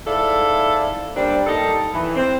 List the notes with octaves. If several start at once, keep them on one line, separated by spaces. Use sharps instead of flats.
G#2 E4 A4 D5 F5
G3 A#3 C4 D4 D5
G3 A#3 D#4 A4
E3
C4